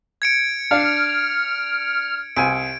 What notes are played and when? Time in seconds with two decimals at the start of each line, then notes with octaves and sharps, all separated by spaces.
0.22 G#6 C#7 D7
0.71 D4 F5 F6
2.37 C2 G#5 D7